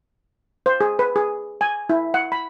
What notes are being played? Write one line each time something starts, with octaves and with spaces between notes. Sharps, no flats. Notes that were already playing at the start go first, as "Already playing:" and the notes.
C5
G#4
B4
G#4
G#5
E4
F#5
B5